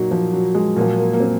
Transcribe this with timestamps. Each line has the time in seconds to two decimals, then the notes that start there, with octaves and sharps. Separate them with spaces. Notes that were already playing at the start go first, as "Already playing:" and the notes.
Already playing: A#2 F#3 D#4
0.11 F3
0.33 F#3
0.54 G#3
0.76 A#2 F3 F#3
0.98 A#3
1.13 A#3
1.20 C4